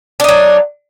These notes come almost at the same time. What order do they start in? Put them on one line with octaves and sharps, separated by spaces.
D4 D#4 F#3